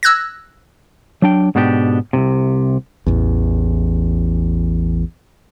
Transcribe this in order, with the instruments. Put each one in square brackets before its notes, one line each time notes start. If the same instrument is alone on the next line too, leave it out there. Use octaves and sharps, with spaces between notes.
[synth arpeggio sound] E6 F#6 G#6 A#6
[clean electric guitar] F#3 D4 G5
G#2 B2 B3 D4 G4
C2 F#2 C3
[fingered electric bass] A1 E2